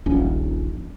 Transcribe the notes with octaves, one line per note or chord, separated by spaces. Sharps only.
D#1 A#1 C#4